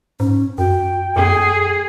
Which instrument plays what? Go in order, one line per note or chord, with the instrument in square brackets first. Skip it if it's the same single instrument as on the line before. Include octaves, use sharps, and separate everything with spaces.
[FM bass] G#2 [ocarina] C#4
[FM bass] F#2 [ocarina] F#4 [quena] G5
[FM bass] F#2 [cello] G#4 [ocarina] A4